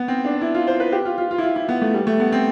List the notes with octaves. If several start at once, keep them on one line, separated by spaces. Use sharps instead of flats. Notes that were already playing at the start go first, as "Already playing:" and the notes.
Already playing: B3
C4
D4
E4
F4
C5
B4
G4
F4
F4
F4
E4
F4
E4
B3
A3
G3
A3
B3
C4